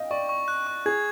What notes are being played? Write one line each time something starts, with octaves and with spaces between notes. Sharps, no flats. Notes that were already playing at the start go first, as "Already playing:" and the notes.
Already playing: D#5 F5 G5
D5 C#6
C#6
F#6
C#6
G#4 G#6